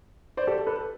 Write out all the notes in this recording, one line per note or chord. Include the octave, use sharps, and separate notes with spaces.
C5 D5
G4 A4
A4 B4